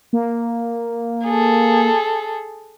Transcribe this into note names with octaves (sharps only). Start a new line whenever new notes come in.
A#3
G#4 A4